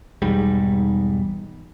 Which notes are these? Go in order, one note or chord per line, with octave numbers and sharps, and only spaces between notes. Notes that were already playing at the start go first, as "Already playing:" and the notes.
B1 E2 G#2 G3